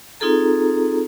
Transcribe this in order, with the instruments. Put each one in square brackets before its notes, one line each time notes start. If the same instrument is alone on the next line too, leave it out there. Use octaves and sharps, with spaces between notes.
[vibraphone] C4 D#4 F4 G#4 A4 A#5